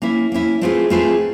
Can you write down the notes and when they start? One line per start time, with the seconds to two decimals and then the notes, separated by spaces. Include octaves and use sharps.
0.02 A#3 C#4 E4
0.32 A#3 C#4 E4
0.61 A3 C4 F4 G#4 B4
0.90 A3 C4 F4 G#4 B4